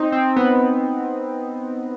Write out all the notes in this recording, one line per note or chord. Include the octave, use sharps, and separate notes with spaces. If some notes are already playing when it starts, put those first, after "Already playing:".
Already playing: C4 D#4
C4
B3